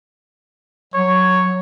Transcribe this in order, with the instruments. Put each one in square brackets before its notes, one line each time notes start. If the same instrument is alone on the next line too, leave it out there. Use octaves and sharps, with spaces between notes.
[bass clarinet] F#3 [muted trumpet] C#5